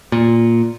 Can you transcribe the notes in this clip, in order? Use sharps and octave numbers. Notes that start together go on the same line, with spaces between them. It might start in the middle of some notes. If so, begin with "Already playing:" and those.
A#2